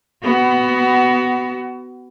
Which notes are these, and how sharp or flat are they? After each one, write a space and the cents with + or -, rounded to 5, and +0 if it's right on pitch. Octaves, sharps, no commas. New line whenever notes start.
B3 +15 F#4 +25